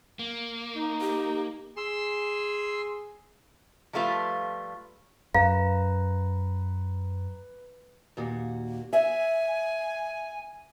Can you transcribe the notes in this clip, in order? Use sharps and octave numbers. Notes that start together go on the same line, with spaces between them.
A#3
D#4
G4
G#4 C6 E6
F3 G3 A3 F4 B4
F#2 B4 F5 A#5
D#2 A#2 F#4
E5 G#5